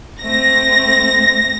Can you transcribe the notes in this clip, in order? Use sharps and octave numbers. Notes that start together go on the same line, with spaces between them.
A3 C4 A#6